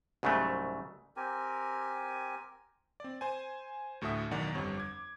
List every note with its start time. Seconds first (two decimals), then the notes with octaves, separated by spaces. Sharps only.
0.23 C2 G#2 C#3 F#3 A3
1.17 C4 G4 A#4 G#5
3.00 C4 D5
3.21 C5 G#5
4.01 D2 A2 F#4 A4 E5 D#6
4.31 B1 E2 D#3 D5 F#5 A#5
4.54 G1 F2 G3 C#5
4.78 D6 G#6